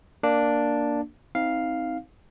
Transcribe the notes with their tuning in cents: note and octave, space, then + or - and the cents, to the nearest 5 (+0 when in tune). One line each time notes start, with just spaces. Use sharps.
A#3 +0 D4 +0
C4 +0 D#4 +30 F5 +0